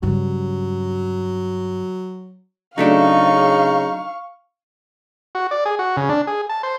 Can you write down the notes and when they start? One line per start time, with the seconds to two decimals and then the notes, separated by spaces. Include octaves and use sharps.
0.03 G2 C#3 F#3
2.78 C#3 F#3 A3 D4 D#4 F5 C#6
5.35 F#4
5.51 D5
5.66 G#4
5.79 F#4
5.97 C#3
6.09 D4
6.27 G#4
6.49 A5
6.63 C5